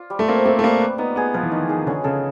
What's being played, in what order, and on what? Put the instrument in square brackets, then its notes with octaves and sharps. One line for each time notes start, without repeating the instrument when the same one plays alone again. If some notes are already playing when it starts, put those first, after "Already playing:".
Already playing: [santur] F4 D5
G3
[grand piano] A3
[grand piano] A#3 [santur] C4
[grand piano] A3 [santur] C4
[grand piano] A3
[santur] G3 [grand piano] A#3
[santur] B4
[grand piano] B3 [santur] D#4
[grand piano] B3 [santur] G#4
[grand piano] F3 [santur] B4
[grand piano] E3
[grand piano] D#3 [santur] D#4
[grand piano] D#3 [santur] G#4
[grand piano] D3 [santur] C#4
[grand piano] C#3 [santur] A4